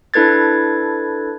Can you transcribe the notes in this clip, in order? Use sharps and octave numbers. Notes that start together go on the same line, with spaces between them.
D4 E4 A4 B4 G#6 A6